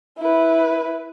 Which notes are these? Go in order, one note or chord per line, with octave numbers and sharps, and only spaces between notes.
E4 B4